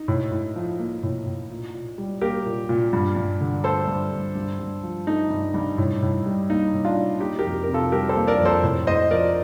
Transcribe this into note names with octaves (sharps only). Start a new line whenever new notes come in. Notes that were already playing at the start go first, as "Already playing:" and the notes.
Already playing: D#4
A2
A2
F3
A#3
A2
A2
A#2
A#2
G3
A#3 G4 A#4
A#2
A#2
G2
G2
D3
A3 A4 C5
G2
G2
G2
G2
F3
A3 D#4
G2
G2
A2
A2
G3
A#3 D#4
A2
D4 F4
A2
A#3 D#4 G4
G4 A#4
F2
C3 A#4
F4 A4
G3 G4 A#4
A4 C5
A#3
A#4 D5
F2
A4 C5
A2
A2 C5 D#5
F3 A#4 D5